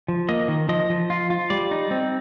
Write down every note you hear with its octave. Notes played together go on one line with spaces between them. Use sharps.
F3
A#3 D#5
D#3
F3 D#5
F3
F4
F4
G3 D5
D#4
C4